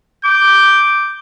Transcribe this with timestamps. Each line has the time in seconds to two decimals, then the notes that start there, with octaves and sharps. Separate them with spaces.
0.25 D6 G6